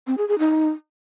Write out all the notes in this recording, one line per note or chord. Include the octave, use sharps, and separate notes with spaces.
C4
G#4
G#4
D#4